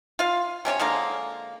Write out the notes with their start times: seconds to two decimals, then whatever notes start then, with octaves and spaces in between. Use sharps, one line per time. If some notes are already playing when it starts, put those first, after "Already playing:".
0.19 F4 F5
0.65 C3 C#4 D4 C#5
0.80 D3 F3 G#3 A#3